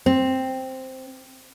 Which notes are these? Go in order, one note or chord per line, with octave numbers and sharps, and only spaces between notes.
C4